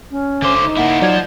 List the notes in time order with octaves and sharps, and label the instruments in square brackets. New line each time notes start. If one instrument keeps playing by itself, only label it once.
[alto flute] C#4
[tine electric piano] G1 [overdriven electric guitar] D3 C5 [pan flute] D6
[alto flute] D#4
[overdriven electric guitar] A#3 E4 [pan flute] F#5
[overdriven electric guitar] F3 [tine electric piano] F#3 D5 G#6